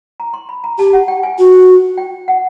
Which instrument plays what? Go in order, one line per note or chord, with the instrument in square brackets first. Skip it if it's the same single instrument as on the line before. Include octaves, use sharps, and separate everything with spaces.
[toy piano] A#5
C6
B5
A#5
[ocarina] G4 [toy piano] A5
[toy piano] F#5
G5
G#5
[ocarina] F#4
[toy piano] G5
F#5